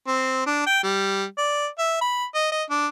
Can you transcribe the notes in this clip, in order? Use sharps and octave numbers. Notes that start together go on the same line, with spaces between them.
C4
D4
G5
G3
D5
E5
B5
D#5
D#5
D4